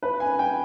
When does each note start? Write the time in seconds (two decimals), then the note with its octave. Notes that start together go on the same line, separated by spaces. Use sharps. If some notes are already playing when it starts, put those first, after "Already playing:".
0.03 B4
0.20 G#5
0.39 G5